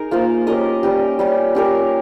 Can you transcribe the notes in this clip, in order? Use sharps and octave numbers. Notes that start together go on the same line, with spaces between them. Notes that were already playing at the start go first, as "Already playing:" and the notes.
Already playing: D#4 G#4 A#4
A#3 F4 C5 F5
C#4 G4 A#4 D#5
G3 C#4 G4
G3 C#4 G4
C#4 G4 A#4